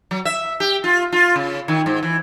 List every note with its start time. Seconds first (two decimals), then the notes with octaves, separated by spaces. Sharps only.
0.11 F#3
0.25 E5
0.60 G4
0.84 F4
1.12 F4
1.36 C#3
1.68 D#3
1.86 G#2
2.03 E3